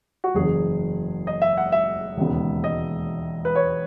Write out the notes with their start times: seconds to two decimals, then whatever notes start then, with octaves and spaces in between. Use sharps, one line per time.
0.24 F#4
0.34 F#1 E2 C#3 G#4
1.27 D#5
1.42 E5
1.57 F#5
1.72 E5
2.17 E1 D#2 C#3 G#3 B3
2.64 D#5
3.45 B4
3.55 C#5